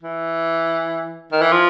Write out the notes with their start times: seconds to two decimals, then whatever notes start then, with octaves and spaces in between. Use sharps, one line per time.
0.03 E3
1.32 D#3
1.42 E3
1.52 F3